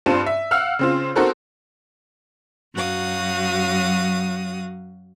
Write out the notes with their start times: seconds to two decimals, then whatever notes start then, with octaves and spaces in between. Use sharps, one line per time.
0.06 G2 C4 F4 A5 D#7
0.26 E5
0.51 F5 F#5 E6 F6
0.79 C#3 C4 F4
1.16 C4 D#4 F#4 A4 A#4 C5
2.74 F#2 F#3 F#4 F5 D#6